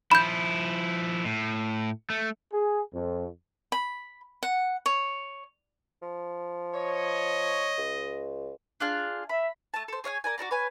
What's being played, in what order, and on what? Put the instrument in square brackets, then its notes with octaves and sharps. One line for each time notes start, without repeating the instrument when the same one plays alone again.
[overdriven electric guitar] F3 E4 [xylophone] B5 G6
[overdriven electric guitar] A2
A3
[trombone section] G#4
F2
[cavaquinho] B5
F#5
C#5
[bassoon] F3
[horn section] C#5 [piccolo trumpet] D#5
[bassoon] C#2
[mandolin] D4 F4 G#4
[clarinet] E5 [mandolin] B5
[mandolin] A3 A5
A4 C5
G#4 C#5 F5 G#5
A#4 D5 G#5
F#4 A4 D5 A#5
B4 C#5 G#5